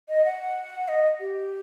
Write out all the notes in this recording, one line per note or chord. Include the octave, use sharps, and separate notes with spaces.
D#5
F#5
D#5
G4